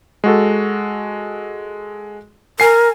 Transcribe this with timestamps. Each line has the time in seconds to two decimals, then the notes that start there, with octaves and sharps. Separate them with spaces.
0.24 G#3 F#4 A4
2.60 A#4 G#5 C7